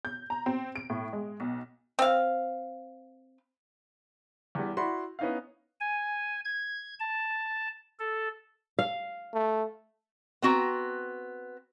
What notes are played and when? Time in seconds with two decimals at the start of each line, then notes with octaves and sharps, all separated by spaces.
0.05 G6
0.30 A#5
0.46 C4
0.76 D7
0.90 A2
1.13 G#3
1.40 B1
1.99 C4 F5
4.55 E2 G3
4.77 E4 F#4 D5 B5 C6
5.19 B3 C#4 D#4 E4 F5
5.81 G#5
6.44 G#6
7.00 A5
7.99 A4
8.79 F5
9.34 A3
10.42 B3 C4 F#4 A#5